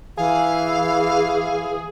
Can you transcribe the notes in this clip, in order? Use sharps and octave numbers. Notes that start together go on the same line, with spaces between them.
E3 G#4 F5